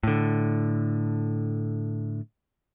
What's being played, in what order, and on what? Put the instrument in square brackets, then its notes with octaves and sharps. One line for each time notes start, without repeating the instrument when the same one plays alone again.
[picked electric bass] A2 D3